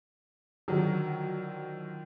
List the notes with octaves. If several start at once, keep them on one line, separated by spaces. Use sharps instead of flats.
D3 D#3 F3 F#3